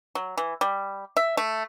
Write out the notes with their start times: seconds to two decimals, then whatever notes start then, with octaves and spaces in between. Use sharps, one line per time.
0.15 F#3
0.37 E3
0.61 G3
1.17 E5
1.37 A3